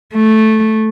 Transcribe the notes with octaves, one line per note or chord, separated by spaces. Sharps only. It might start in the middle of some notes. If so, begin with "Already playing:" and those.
A3